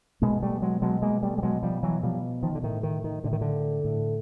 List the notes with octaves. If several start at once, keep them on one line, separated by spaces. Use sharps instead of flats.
B2 G#3 A#3
G3 A3
F#3 G#3
B2 F#3 G#3
G#3 A#3
G3 A3
G3
B2 F#3 G#3
F3 G3
E3 F#3
B2 F3 G3
D#3 F3
D3
A2 D#3
D#3
D#3
A2 D3
D#3
D3
A2